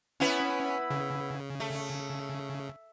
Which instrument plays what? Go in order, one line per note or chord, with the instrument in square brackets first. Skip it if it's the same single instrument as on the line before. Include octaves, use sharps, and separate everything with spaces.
[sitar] B3 E4 B4 [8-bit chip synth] C#4
[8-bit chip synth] C#3
[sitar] A3